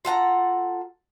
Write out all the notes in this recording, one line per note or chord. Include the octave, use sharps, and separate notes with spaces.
F4 A4 F#5 A#5